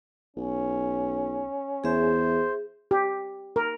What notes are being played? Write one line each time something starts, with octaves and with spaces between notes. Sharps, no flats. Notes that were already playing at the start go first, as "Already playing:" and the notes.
B1 C#4
E2 G#4 C5 E5
G4
A#4